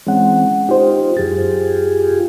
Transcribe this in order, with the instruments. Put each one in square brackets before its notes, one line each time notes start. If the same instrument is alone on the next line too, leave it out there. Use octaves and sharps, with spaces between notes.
[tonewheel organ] E3 C4 [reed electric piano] G#3 C#4 F#5
[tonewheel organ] D#4 F4 [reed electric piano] G4 C5
[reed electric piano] F#2 A6 [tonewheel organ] F4 G4 G#4